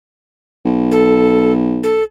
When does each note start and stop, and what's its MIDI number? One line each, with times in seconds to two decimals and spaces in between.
0.65 2.01 35
0.91 1.53 69
1.83 2.03 69